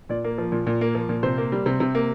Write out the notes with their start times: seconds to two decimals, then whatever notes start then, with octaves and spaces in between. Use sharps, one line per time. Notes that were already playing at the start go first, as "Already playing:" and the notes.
0.09 A#2 D5
0.24 A#3
0.38 F3
0.52 A#2
0.67 A#2
0.81 A#3
0.95 F3
1.09 A#2
1.23 C3 C5
1.38 A#3
1.52 G3
1.66 C3
1.80 C3
1.95 A#3